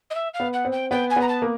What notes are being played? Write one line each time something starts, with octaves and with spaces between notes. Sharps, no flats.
D#5
E5
F5
B3
F#5
C4
G5
B3 G5
G#5
B3 A#5
A5
A#3